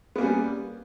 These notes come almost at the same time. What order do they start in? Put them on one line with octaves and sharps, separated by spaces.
B3 A#3 C#4 G3